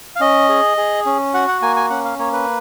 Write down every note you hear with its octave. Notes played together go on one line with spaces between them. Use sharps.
F5
C#4 D#5
G#4
G#4
C#4
F#4 F#5
F#5
A#3 G#5
G#5
C#4 F#5
F5
A#3 C#5
B4